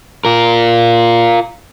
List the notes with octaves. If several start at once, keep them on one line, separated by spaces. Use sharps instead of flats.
F4 A#4